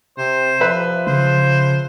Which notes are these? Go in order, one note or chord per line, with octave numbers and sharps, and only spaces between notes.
C3 C5
F3 B4 E5
C#3 C5